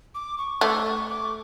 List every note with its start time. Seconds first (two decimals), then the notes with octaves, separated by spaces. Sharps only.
0.15 D6
0.38 C#6
0.61 A3 D6
0.85 C#6
1.09 D6